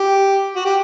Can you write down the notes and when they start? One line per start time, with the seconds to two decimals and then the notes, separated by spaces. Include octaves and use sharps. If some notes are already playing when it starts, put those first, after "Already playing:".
Already playing: G4
0.56 F#4
0.65 G4